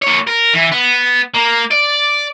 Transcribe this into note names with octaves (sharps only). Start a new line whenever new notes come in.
A#3 C#5
A#4
E3
B3
A#3
D5